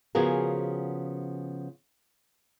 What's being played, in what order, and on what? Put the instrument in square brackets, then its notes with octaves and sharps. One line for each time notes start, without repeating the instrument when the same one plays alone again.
[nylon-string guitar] C#3 F3 B3 F#4 G#4 A#4